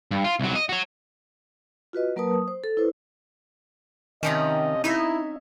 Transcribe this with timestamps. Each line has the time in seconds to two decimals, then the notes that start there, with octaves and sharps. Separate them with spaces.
0.11 G2
0.24 F4
0.40 C2 F#3
0.55 D#5
0.69 F#4 C#5
1.93 F4 F#4 B4 D#5
2.16 F#3 A#3 A#4 B4 A5 D#6
2.34 D#6
2.48 C5
2.64 A4
2.77 E4 B4 C5
4.23 C3 D#3 F3 C#4 D#5
4.84 D#4 E4 C#5 D#5 E5